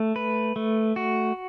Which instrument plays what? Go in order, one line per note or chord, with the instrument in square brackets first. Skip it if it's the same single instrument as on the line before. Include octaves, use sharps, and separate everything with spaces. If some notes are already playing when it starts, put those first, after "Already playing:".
Already playing: [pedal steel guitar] A3
B4
A3
F#4